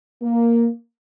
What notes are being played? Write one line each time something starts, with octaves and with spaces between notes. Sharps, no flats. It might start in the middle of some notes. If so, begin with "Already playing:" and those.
A#3